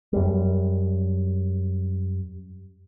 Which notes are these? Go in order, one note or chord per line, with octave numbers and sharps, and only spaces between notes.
F#2 G3